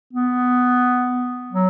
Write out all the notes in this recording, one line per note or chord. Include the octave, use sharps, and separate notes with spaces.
B3
F#3